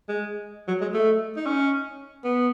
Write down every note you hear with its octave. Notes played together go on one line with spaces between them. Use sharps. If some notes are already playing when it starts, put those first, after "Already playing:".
G#3
F#3
G#3
A3
D#4
C#4
B3